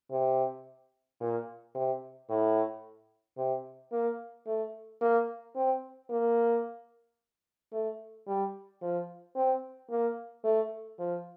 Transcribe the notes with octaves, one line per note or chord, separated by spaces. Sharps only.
C3
A#2
C3
A2
C3
A#3
A3
A#3
C4
A#3
A3
G3
F3
C4
A#3
A3
F3